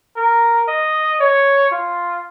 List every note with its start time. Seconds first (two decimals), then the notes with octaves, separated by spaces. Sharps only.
0.16 A#4
0.68 D#5
1.20 C#5
1.72 F4